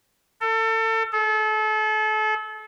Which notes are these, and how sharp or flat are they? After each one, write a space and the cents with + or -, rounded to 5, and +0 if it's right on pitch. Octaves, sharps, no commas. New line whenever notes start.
A4 +30
A4 -35